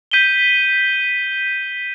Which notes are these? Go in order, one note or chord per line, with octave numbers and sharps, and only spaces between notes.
G6 B6 D#7 G7